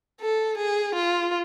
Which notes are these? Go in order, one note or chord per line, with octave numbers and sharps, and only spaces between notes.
A4
G#4
F4